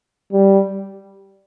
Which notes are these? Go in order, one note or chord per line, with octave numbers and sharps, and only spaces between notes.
G3